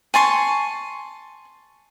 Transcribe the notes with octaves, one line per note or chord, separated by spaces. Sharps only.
G#5 A5 C6 C#6